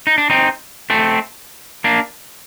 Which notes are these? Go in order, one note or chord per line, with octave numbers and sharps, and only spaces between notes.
D#4
D4
C4 D#4
A3 C4
A#3 D4